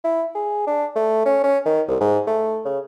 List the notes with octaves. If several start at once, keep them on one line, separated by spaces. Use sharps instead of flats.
E4
G#4
D4
A3
C#4
C#4
D#3
C2
G#2
A3
C#3